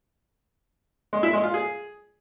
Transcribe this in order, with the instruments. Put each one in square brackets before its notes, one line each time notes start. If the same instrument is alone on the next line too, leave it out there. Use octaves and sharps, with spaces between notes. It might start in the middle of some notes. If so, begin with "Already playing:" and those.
[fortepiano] G#3
E4
G#3
F4
G#4